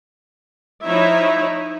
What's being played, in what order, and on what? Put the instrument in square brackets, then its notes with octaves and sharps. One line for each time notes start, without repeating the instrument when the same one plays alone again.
[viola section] F3 D#4 E4 C#5 E5